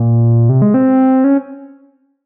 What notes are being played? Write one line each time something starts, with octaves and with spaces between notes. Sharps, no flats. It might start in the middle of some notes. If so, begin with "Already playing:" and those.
Already playing: A#2
C3
G#3
C4
C#4